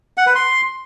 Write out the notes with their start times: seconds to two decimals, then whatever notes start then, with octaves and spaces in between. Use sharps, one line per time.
0.17 F#5
0.26 B4
0.35 C6